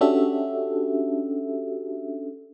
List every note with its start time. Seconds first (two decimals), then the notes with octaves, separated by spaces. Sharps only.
0.01 C#4 D4 F#4 G4 A4 E5